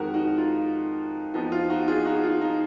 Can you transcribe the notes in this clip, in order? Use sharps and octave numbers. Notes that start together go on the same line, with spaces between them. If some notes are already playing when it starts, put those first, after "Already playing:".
Already playing: F2 D#3 G#3 F#4 A#4
D#4 F#4
F4
F2 F3 B3 D#4
F4
D#4 F#4
F4 G#4
D#4 F#4
F4
D#4